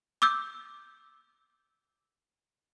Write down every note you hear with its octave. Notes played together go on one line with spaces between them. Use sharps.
D6 E6 G6